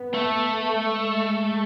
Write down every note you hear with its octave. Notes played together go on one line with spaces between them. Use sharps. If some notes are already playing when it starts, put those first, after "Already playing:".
Already playing: B3
A3
G#3